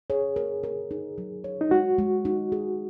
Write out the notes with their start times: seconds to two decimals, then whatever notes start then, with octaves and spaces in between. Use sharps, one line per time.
0.10 G#4 C#5
0.36 A#4
0.64 A#4
0.91 D#4
1.18 F#3
1.44 C#5
1.61 D#4
1.71 G#3 F#4
1.99 G#3
2.25 D#4
2.52 G#4